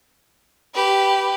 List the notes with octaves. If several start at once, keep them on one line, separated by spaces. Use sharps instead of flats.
G4 B4